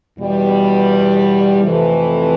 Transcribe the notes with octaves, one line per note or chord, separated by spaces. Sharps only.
E2 B2 G3
F2 C3 E3 A3